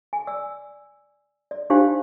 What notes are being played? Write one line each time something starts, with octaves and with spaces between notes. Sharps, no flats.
G#5
D5 E6
D5
D4 D#4 F4 G4 C5 F5